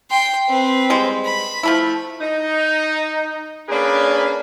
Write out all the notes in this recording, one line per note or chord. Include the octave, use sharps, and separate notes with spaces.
G5 C6
C4 B4
G3 G#3 C5
B5
F3 A3 E4
D#4
A#3 C#4 D4 G#4 A#4 B4